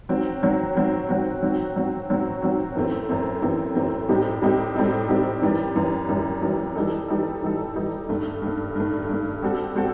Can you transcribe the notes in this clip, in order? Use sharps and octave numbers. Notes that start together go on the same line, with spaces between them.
D#3 F#3 C4 F#4
D#3 F#3 C4 F#4
D#3 F#3 C4 F#4
D#3 F#3 C4 F#4
D#3 F#3 C4 F#4
D#3 F#3 C4 F#4
D#3 F#3 C4 F#4
D#3 F#3 C4 F#4
F#2 E3 A3 C4
F#2 E3 A3 C4
F#2 E3 A3 C4
F#2 E3 A3 C4
A2 G3 C4 D#4 G4
A2 G3 C4 D#4 G4
A2 G3 C4 D#4 G4
A2 G3 C4 D#4 G4
F#2 E3 G3
F#2 E3 G3
F#2 E3 G3
F#2 E3 G3
E3 G3 D#4 A4
E3 G3 D#4 A4
E3 G3 D#4 A4
E3 G3 D#4 A4
G2 D#3 A3
G2 D#3 A3
G2 D#3 A3
G2 D#3 A3
G3 C4 F#4 A4
G3 C4 F#4 A4